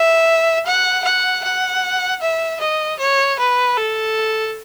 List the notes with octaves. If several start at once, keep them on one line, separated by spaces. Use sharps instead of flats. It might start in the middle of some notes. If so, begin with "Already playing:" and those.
Already playing: E5
F#5
F#5
F#5
E5
D#5
C#5
B4
A4